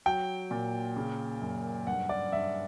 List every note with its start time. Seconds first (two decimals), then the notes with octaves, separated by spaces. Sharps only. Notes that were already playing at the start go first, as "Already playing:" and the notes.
0.06 F#3 G5
0.51 A#2
0.96 C#3
1.41 F#2
1.87 G2 F#5
2.09 D5
2.32 G2 E5